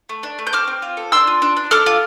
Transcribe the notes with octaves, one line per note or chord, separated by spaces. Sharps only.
A3
D4
A3
G6
C4 D6 F6
C4
F4
A4
D4 C6 E6
F4
D4
D4
A4 D6 F6
F4